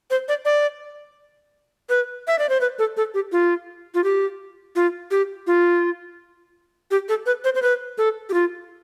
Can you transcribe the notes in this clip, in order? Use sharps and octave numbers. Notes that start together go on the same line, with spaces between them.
C5
D5
D5
B4
E5
D5
C5
B4
A4
A4
G4
F4
F4
G4
F4
G4
F4
G4
A4
B4
C5
C5
B4
A4
G4
F4